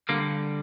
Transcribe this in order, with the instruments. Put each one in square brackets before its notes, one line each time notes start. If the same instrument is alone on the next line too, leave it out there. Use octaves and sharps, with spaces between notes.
[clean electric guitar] D3 G3 A#3